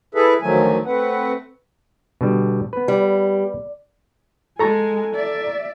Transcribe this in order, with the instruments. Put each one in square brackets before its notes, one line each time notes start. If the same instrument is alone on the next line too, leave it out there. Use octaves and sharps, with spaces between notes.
[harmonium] E4 G#4 A4 B4 E5
D2 D#3 F3 F#3 A3 G#5
A3 C4 B4 F#5
[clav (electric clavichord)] B2 D3 G3
B3 B4
[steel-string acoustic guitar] G3
[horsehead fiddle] G#3 G#5 [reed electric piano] A4 A#5 C#6
[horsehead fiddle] D5 E5